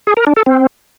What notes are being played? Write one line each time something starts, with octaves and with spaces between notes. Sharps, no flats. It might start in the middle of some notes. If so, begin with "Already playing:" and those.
G#4
A#4
D4
A4
C4